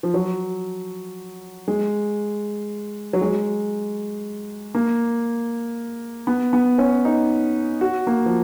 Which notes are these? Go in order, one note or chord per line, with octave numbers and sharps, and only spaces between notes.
F3
F#3
G#3
F#3
G#3
A#3
B3
B3
C#4
D#4
F#4
A#3
F3